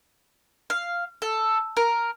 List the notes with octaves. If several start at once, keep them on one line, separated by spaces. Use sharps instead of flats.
F5
A4
A#4